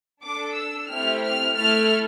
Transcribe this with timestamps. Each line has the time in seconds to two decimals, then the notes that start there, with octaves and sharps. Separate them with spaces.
0.23 D4 A4 D6
0.56 E6
0.89 A3 C4 E4 G4 F6
1.23 F6
1.56 A3 E4 A4 F6